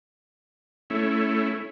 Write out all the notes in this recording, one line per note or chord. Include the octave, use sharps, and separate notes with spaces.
A3 C#4 E4